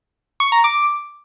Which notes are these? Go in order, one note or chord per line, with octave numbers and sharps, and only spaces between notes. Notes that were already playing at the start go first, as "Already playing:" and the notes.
C#6
A#5
D6